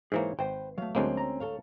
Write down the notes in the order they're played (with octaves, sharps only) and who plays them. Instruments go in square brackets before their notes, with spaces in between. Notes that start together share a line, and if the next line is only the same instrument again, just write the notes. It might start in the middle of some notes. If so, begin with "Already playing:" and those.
[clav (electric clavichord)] G#2 E3 A#3 [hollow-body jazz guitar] G#4 C5 C#5
[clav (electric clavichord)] G#1 [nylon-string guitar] B4 [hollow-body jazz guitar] C5 G5
[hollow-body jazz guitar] F#3 A3 [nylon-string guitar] F5
[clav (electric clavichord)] D2 G#3 A#3 [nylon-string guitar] C4 C#4
[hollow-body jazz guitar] A#5
[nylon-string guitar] A4 C#5 F5